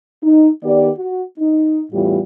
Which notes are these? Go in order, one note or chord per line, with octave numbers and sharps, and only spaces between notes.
D#4
D#3 B3 G4 D5
F#4
D#4
E2 A2 G3 F4 G4